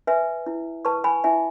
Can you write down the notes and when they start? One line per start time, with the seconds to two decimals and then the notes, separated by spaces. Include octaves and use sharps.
0.07 B4 E5 G#5
0.46 E4
0.85 B4 A5 C#6
1.04 G#5 B5
1.24 E4 E5 G#5